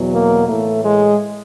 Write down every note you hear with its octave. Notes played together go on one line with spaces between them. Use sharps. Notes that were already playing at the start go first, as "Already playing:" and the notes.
Already playing: E2 B2 F#3
A#3
A2 E3 A3
G#3